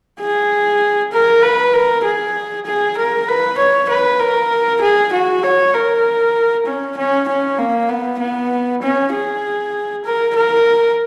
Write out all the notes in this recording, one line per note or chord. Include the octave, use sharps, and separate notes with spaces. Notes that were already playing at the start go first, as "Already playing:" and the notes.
G#4
A#4
B4
A#4
G#4
G#4
A#4
B4
C#5
B4
A#4
G#4
F#4
C#5
A#4
C#4
C#4
C#4
A#3
B3
B3
C#4
G#4
A#4
A#4